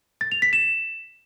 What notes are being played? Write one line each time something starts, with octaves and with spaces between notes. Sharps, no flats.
A6
F7
B6
E7